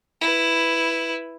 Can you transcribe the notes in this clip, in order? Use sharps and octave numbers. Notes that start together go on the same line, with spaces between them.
E4 B4